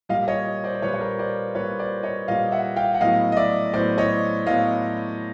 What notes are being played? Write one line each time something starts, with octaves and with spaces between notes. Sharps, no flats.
A#2 G3 A#3 D#5 F5
C#5 D#5
C5 D5
C5
A#2 G3 A#3 B4 C#5
C#5
A#4 C5
C5 D5
A#2 G3 A#3 B4 C#5
C5 D5
C#5 D#5
A#2 G3 A#3 D#5 F5
E5 F#5
F5 G5
F#5
A2 F#3 B3 D#5 F5
D#5
D5 E5
A2 F#3 B3 C5 D5
C#5 D#5
A2 F#3 B3 D#5 F5